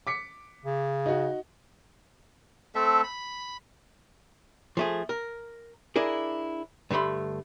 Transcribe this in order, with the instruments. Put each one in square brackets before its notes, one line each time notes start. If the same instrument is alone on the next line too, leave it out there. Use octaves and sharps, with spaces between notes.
[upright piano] D6 B6 C#7
[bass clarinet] C#3
[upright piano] D#4 F#4
[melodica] A3 C4 A4 E5
B5
[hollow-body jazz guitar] F3 A3 G#4
A#4
D4 E4 G#4 A#4
G2 D3 A3 B5 C6